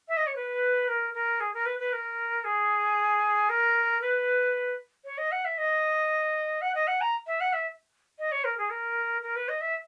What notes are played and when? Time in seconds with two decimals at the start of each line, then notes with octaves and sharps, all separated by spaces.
0.08 E5
0.17 D#5
0.26 C#5
0.35 B4
0.88 A#4
1.14 A#4
1.40 G#4
1.53 A#4
1.65 B4
1.79 B4
1.92 A#4
2.44 G#4
3.49 A#4
4.01 B4
5.04 C#5
5.18 D#5
5.31 F#5
5.45 E5
5.57 D#5
6.61 F#5
6.74 D#5
6.87 F#5
7.01 A#5
7.26 E5
7.40 F#5
7.53 E5
8.18 D#5
8.31 C#5
8.44 A#4
8.57 G#4
8.70 A#4
9.22 A#4
9.35 B4
9.48 D#5
9.61 E5